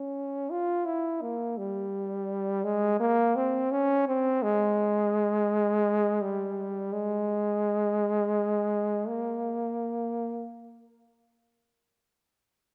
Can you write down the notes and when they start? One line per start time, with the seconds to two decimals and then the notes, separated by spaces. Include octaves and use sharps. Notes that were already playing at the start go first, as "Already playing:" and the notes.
Already playing: C#4
0.51 F4
0.86 E4
1.22 A#3
1.58 G3
2.64 G#3
3.00 A#3
3.36 C4
3.72 C#4
4.08 C4
4.43 G#3
6.22 G3
6.93 G#3
9.08 A#3